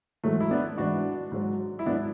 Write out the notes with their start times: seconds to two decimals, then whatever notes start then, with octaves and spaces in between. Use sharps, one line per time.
0.24 G#2 E3 F#3 A3
0.40 E4
0.51 B3 D4
0.78 G#2 E3 D4 F#4
1.32 G#2 F#3
1.79 E4
1.86 G#2 F#3 B3 D4